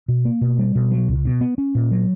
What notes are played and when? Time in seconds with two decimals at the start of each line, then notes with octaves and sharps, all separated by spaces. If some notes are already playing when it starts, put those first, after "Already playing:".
0.08 B2
0.25 A#3
0.41 B2
0.59 G3
0.75 B2
0.91 F#3
1.08 C#2
1.25 B2
1.41 B3
1.58 C#4
1.75 A#2
1.91 F#3